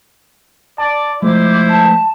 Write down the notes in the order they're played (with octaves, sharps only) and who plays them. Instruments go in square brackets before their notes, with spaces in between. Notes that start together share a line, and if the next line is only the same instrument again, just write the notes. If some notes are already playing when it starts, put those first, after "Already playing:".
[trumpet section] D5 [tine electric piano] A5
[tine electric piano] F3 G#3 A3 [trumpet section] E4 C5 [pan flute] D6
[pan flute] A5